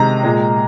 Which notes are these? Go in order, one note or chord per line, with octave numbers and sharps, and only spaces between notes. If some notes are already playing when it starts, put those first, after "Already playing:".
Already playing: C3 D#3 G#3 A#5
A#2 G#3